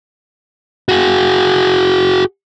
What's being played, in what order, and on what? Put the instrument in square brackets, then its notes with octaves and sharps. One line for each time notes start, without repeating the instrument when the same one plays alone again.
[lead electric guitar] F#4 G#4